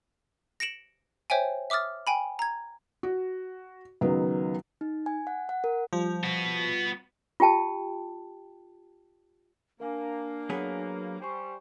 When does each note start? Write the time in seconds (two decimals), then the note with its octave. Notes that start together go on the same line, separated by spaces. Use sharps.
0.60 A#6 C#7 D7 E7 F#7
1.30 C5 C#5 E5 G5 G#5
1.70 E5 D6 D#6 F6 A6
2.07 G5 G#5 B5
2.39 A#5 G#6
3.03 F#4
4.01 C#2 D#3 F#3 B3
4.81 D#4
5.06 G#5
5.27 F#5
5.49 F#5
5.64 A#4
5.93 F3 G3 F4
6.23 B3 F#4
7.40 F4 G4 G5 A5
9.80 A#3 D4 A#4 F5 G#5
10.50 F#3 B3 G#4
11.20 G3 C5 G5 G#5 C#6